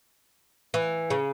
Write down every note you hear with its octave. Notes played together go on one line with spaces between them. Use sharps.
E3
C#3